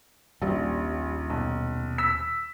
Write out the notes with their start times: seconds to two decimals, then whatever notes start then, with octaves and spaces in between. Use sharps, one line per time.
0.42 D#1 A#1 G3
1.30 B1
1.98 E6 B6